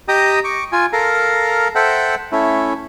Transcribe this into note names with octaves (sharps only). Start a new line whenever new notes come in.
G4 D#5 G5 A#5 D#6
C#6 D6
F4 G#5
A4 A#4 F5 A#5
A4 C5 E5 F#5 G5
A3 C#4 E4